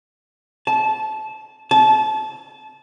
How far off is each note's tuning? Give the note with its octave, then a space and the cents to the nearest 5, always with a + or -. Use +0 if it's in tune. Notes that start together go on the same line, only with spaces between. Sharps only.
A5 -20
A5 -25